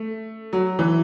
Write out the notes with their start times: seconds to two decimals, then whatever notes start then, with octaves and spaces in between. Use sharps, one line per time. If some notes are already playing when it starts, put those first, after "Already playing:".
Already playing: A3
0.53 F#3
0.79 E3